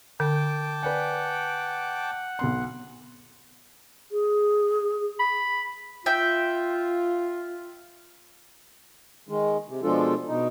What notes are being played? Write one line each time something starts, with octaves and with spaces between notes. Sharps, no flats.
D3 G5 A5 D6
B4 D5 F#5 G#5
B1 B3 C6
G#4
B5
F4 E5 G5
D#3 G#3
C3
B2 F3 G#3 D4 F4 A4
B2 D#4